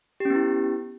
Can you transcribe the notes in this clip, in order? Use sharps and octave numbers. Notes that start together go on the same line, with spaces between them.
B3 C#4 E4 G4